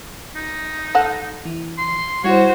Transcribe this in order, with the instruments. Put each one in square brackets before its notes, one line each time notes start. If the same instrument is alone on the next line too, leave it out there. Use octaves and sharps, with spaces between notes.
[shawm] D#4
[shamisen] A4 F#5
[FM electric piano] E3
[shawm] C6
[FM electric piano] G3 E4 [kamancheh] F#4 C5 [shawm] C#5